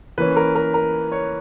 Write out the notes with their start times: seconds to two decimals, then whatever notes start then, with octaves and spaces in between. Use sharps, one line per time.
0.18 E3 A#3 C#4 B4
0.36 A#4
0.55 A#4
0.74 A#4
1.12 C#5